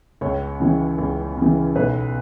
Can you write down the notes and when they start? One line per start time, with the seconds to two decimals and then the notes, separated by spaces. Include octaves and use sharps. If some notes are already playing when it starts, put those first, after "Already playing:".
0.21 C#2 C#5
0.60 C#3 E3
0.98 C#2
1.37 C#3 E3
1.75 B1 B4